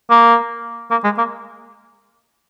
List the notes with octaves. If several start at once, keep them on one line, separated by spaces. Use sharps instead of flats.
A#3
A#3
G#3
A#3